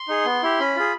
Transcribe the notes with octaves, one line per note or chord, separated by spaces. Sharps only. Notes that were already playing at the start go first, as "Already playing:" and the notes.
Already playing: C6
D#4 G#4
B3
E4 G4
C#4 B5
F4 G#4